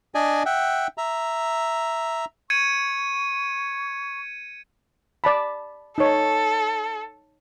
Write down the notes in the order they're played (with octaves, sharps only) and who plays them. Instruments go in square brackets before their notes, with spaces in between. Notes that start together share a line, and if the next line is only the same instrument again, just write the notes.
[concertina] D4 D5 D#5 G#5
E5 F#5 G5
E5 A#5
[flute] C#6 [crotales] G#6 C#7 D#7
[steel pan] D5 A5 B5
[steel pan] D#4 C#5 [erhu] A4